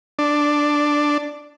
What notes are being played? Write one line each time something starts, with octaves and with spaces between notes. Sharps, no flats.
D4